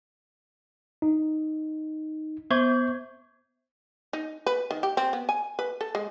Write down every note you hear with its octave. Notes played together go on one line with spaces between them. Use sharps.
D#4
B3 C5 C#6 G6 G#6
D#4
B4
D#3
G4
C4
B3
G#5
B4
A4
G#3